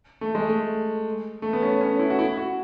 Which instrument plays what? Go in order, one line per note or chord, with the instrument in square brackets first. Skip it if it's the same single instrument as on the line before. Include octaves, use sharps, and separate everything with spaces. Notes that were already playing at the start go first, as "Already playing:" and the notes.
[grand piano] A3
G#3
A3
A3
B3
C#4
C#4
E4
F#4
E4
F#4